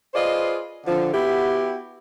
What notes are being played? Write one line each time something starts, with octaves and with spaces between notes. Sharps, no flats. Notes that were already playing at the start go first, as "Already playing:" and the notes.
F4 G#4 B4 C5 D5 D#5
D3 F3 C4
B3 E4 F#4 G4